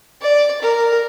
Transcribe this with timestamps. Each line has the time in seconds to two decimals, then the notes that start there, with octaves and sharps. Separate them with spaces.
0.21 D5
0.62 A#4